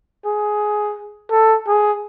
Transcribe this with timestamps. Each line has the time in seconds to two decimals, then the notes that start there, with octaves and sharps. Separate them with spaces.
0.25 G#4
1.32 A4
1.68 G#4